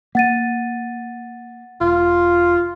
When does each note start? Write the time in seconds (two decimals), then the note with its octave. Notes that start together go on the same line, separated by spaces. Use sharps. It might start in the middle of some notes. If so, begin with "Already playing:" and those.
0.15 A#3 F#5 A6 D#7
1.81 E1 F4